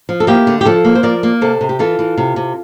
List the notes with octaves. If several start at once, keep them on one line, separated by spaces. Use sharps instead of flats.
F3
A4
A#3 E4 G4
D3
G4
F3 F4 A4
A#3
C5
F3 A#4 D5
A#3
C3 A4 C5
C3
G4
E3 F4 A4
E3
C3
C3